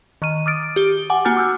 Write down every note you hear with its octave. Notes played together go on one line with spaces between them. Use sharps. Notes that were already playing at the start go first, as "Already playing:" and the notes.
D#3 C#6 F6 D#7
D6 D#6 F6 A6 D7
G4 G7
F#5 G#5 D6
A#3 F#4 G#5 F6 G6 A6
D6 E6 F6 G6